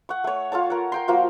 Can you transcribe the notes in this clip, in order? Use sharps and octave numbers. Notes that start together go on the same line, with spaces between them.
F#5 C#6
A3 C#5
F4 A4 C#5 A5
A#4 F#5
A#4 G5 C6
F3 A#3 F4 F#4